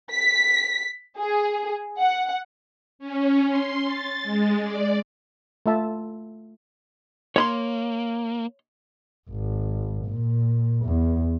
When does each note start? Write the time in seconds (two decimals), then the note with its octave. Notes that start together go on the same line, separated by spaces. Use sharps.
0.12 B6
1.19 G#4
1.99 F#5
2.99 C#4
3.46 C6
3.85 A6
4.22 G#3
4.62 D5
5.66 A3 F4 E5 A5
7.36 A#3 C#5 B5 C6
9.30 G#1
10.06 A#2
10.85 E2